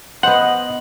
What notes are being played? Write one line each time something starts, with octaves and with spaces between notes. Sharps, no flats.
B3 C5 D#5 F#5 F#7